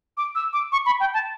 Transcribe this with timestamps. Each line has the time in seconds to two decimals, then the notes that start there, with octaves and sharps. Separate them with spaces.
0.17 D6
0.35 E6
0.53 D6
0.72 C#6
0.86 B5
1.00 G5
1.14 A5